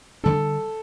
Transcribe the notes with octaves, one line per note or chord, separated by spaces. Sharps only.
D3 G3 D4 A4